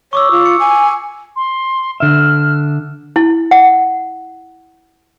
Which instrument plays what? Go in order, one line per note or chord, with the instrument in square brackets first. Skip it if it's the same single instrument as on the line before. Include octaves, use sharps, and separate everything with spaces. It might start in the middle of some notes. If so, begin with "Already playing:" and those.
[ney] C#5 [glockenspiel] C#6 D6 E6
[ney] F4
[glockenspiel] C#7
[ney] G#5
[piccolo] C6
[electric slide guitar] D3 E5 [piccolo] F6
[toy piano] E4
F#5